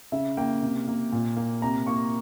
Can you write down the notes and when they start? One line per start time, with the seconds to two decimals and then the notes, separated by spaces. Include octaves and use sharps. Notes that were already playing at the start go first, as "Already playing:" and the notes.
0.12 C#3 E5
0.37 A#3 G5
0.62 C3
0.88 A#3
1.12 A#2
1.37 A#3
1.62 C3 A#5
1.86 A#3 C#6